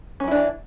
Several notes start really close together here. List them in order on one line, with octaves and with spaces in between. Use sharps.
C#4 F#3 E4 D4 E3